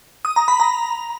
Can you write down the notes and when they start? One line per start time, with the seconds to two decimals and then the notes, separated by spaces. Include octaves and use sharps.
0.25 D#6
0.36 A#5
0.48 B5
0.60 A#5